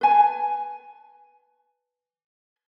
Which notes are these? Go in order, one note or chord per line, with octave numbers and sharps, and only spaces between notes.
B4 G#5 A5